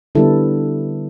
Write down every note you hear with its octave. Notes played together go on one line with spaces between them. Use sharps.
D3 G3 B3 E4 A4